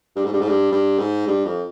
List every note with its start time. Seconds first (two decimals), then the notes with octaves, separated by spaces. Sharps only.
0.16 G2
0.25 G#2
0.33 G2
0.40 G#2
0.48 G2
0.72 G2
0.99 G#2
1.28 G2
1.46 F2